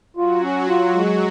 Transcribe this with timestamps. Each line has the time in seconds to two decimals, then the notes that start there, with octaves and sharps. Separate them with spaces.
0.17 F#3 F4 F#4
0.42 C#4
0.68 F#3 F4 F#4
0.95 G#3